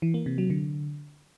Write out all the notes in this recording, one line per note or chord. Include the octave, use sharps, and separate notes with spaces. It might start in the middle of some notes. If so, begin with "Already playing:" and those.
E3
A#3
C3
F#3
D3